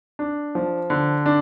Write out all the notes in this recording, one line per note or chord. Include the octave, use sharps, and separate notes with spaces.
D4
F3
D3
D4